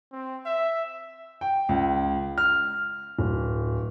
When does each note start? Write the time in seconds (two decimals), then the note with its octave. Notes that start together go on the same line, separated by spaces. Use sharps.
0.12 C4
0.46 E5
1.41 G5
1.69 C#2
2.38 F6
3.19 D1